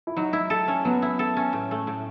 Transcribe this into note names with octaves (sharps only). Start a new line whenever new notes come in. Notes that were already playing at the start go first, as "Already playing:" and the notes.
E4
F#3 D#4
E4
A4
C#4
F#3 B3
E4
A4
C#4
A2
A3
A2